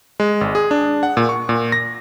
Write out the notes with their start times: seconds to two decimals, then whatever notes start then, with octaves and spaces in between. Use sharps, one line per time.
0.20 G#3
0.41 G#1
0.55 G#4
0.71 D4
1.03 F#5
1.17 A#2
1.29 C#6
1.49 A#2
1.72 A#6